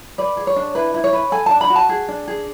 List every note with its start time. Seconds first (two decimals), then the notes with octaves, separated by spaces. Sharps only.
0.18 B4 D5
0.37 G#4
0.47 C#5
0.56 D4
0.75 E4 B4
0.94 E4
1.04 C#5
1.13 B4
1.32 A4 G#5
1.46 D4 A5
1.61 B5
1.70 F#4
1.76 A5
1.89 G#4
2.09 D4
2.28 G#4